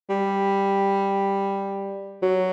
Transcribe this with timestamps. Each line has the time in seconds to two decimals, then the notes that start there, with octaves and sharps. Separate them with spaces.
0.10 G3
2.23 F#3